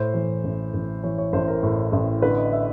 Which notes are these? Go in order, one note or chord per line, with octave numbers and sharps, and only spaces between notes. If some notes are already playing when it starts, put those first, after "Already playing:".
Already playing: A2 C5
E3
A1
A1
E3 C#5
C#5
A1 C5
A#4
A2
A1
D3 B4
D#5
E5